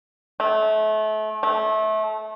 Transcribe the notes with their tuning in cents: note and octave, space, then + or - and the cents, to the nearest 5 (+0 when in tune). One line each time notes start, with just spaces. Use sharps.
A3 -30
A3 -25